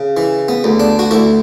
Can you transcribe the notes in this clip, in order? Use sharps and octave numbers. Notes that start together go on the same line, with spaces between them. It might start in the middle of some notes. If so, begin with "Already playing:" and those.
Already playing: C#3
E3
B3
D2
D4
F#4
D2 E4